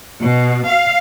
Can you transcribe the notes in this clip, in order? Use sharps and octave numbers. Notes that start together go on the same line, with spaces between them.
B2
F5